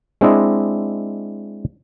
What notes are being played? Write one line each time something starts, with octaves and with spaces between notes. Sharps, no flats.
G#3 C4 D4 E4 D#5